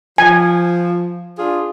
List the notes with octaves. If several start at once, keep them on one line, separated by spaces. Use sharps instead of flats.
F3 G#5
D4 F4 G#4